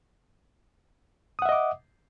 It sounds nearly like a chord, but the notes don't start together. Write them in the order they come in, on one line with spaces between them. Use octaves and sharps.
D#6 F#5 E5 D#5 D6